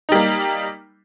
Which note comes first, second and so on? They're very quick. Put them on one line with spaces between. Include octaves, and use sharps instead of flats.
D#4 G3 A#3